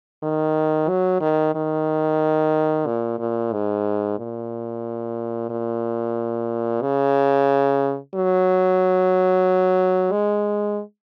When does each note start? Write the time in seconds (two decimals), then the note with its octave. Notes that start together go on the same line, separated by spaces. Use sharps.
0.23 D#3
0.88 F#3
1.21 D#3
1.55 D#3
2.87 A#2
3.19 A#2
3.52 G#2
4.18 A#2
5.50 A#2
6.82 C#3
8.14 F#3
10.12 G#3